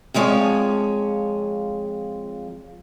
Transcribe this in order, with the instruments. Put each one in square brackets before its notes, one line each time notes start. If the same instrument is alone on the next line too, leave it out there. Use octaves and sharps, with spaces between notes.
[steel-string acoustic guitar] F2 F3 G#3 C#5